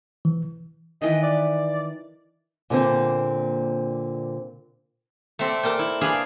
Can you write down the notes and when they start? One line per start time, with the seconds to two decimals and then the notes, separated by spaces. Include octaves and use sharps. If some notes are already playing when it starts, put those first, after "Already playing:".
0.25 E3
1.02 D#3 E3 B4 D#5
1.23 D5
2.70 A#2 D3 A#3 C4
5.39 A3 C4 A4 D5
5.63 A4 A#4 D5 G5
5.79 E4
6.01 D4 G#4 B4 D5 F5 B5